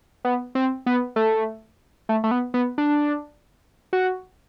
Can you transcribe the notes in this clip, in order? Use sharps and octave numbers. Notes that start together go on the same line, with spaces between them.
B3
C4
B3
A3
A3
A3
B3
B3
D4
F#4